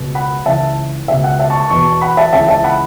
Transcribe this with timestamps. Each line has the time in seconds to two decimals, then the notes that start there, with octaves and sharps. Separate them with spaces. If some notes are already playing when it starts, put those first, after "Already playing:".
Already playing: C#2 B2
0.15 F#5 B5
0.46 C#2 C#3 E3 E5 A5
1.08 C#2 B2 E5
1.24 F#5
1.39 E5 A5
1.50 A5 C#6
1.60 A5 C#6
1.70 E2 B2 A5 C#6
2.01 F#5 B5
2.17 E5 A5
2.33 C#2 C#3 E3 E5 A5
2.48 E5 A5
2.64 F#5 B5